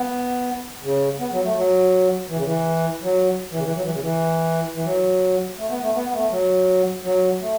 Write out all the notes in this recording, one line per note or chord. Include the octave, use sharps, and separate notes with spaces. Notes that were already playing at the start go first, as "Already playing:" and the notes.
Already playing: B3
C#3
B3
F#3
A3
F#3
E3
C#3
E3
F#3
E3
C#3
E3
F#3
E3
C#3
E3
E3
F#3
A3
B3
A3
B3
B3
A3
F#3
F#3
A3